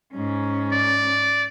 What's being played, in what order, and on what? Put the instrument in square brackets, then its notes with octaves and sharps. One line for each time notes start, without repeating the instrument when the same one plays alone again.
[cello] G#2 C#4
[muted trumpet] D5